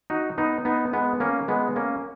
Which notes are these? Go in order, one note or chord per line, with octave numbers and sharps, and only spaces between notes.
D#4 F#4
B3 D#4
B3 D#4
G#3 B3
A#3 C#4
G#3 B3
A#3 C#4